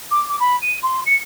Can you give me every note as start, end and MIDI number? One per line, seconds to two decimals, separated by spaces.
0.11 0.26 86
0.28 0.36 86
0.40 0.56 83
0.61 0.76 99
0.82 1.00 84
1.06 1.17 97